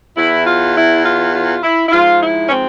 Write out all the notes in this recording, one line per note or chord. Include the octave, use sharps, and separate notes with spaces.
E2 E3 E4
F4
E4
F4
F4
E4
E4
G#2 F3 F4
E4
C#4
C4